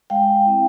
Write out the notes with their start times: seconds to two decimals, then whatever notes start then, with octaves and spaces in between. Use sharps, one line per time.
0.10 G#3 F5 G5
0.45 C4 E4